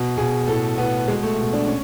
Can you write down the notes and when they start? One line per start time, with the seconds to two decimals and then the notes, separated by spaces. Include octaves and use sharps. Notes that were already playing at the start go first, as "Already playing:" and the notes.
Already playing: B2
0.18 B2 G#4
0.48 A2 A4
0.78 A2 B3
1.08 B2 G#3
1.23 A3
1.38 B2
1.53 D4
1.68 C#4